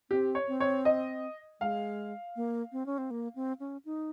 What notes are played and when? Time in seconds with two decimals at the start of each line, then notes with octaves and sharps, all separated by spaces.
0.10 C4 G4
0.35 C#5
0.48 C4
0.60 C#5
0.85 D#5
1.60 G#3 F5
2.36 A#3
2.72 C4
2.86 C#4
2.98 C4
3.11 A#3
3.35 C4
3.60 C#4
3.85 D#4